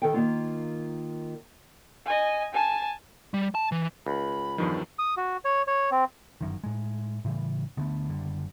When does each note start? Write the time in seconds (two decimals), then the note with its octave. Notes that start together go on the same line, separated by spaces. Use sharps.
0.02 D#3 A4 G5
0.14 D#3 A#3 F4
2.06 D#5 G#5
2.53 G#5 A5
3.34 G3
3.55 A5
3.72 E3
4.07 C#2 B5
4.58 E2 G2 D#3 F3
4.99 D#6
5.17 F#4
5.45 C#5
5.68 C#5
5.91 C4
6.41 G1 F#2 D#3
6.64 A2 G#3
7.25 A2 C#3 E3 G3
7.77 D2 D3 A3 B3
8.09 F#1 F#2 D3 G3